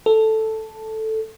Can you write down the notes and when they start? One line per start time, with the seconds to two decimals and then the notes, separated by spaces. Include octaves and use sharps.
0.06 A4